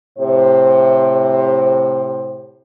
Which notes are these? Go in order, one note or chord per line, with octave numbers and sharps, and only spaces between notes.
A2 C3 C5